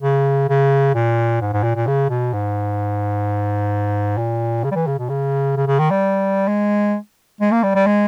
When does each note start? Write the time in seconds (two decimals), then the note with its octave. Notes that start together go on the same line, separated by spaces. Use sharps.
0.02 C#3
0.49 C#3
0.95 A#2
1.41 G#2
1.52 G#2
1.63 A#2
1.75 A#2
1.87 C#3
2.09 B2
2.33 G#2
4.18 A#2
4.64 C#3
4.71 G3
4.75 E3
4.87 C#3
4.98 B2
5.09 C#3
5.56 C#3
5.67 C#3
5.79 D#3
5.90 G3
6.48 G#3
7.41 G#3
7.52 A#3
7.63 G3
7.75 G3
7.87 G#3